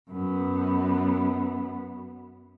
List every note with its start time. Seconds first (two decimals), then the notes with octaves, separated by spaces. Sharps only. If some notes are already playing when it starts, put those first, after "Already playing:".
0.10 F#2 B3